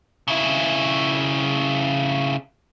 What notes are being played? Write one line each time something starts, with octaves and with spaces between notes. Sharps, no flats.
C#3 E4